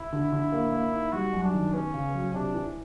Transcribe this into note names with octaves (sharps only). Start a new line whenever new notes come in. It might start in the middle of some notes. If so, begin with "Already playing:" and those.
Already playing: E4
D3
D3
A#3
A#3
D#4
G3 F#4
F#2
D4
D#3
B3 C#4
C#3
F#3
C3 D4
E3